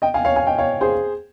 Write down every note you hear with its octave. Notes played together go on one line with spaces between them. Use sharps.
D#5 G5
F5 G#5
C#5 F5
F5 G#5
D#5 G5
C#5 F5
G#4 C5